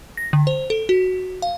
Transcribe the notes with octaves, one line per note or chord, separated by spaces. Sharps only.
A#6
D3
C5
A4
F#4
F5